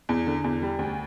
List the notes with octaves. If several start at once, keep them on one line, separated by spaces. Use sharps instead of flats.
E2
D3
E2
G3
D2